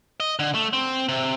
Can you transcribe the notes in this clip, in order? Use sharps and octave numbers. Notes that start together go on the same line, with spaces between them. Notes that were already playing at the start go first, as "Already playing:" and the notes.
D#5
D3
A3
C4
C3